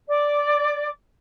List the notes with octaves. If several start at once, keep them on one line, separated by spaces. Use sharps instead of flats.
D5 D6